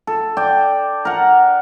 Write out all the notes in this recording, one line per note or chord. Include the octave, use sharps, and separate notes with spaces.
A4
D5 G5
A#4 F#5